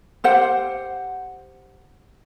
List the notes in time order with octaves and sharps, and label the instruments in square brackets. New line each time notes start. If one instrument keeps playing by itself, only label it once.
[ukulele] G4 C5 F#5